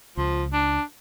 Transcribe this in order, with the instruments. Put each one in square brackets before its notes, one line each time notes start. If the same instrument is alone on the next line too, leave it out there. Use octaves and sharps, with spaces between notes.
[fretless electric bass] C#2 [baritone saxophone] F3
[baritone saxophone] D4